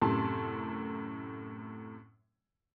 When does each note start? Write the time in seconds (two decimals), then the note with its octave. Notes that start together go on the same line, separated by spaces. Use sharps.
0.01 F#2 A2 C3 A5 C6